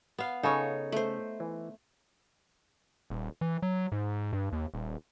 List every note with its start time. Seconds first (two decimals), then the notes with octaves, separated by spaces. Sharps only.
0.18 B3 F5
0.43 C#3 D#4 A4 C#5
0.92 A3 C5
1.40 E3
3.10 D#1
3.41 E3
3.62 F#3
3.92 G#2
4.33 G2
4.52 D#2
4.74 D#1